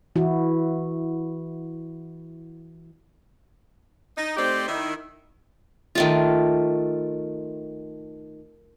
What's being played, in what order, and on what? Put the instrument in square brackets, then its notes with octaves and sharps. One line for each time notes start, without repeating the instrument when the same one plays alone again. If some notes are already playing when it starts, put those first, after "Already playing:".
[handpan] E3 E4 F#4
[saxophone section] D#4
A3 C4 D#4 G4 C5 D5
D#3 E4
[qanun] D#3 A3 F4